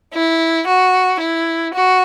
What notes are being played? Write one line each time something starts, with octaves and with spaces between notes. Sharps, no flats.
E4
F#4
E4
F#4